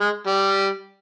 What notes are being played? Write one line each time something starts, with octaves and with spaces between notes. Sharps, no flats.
G#3
G3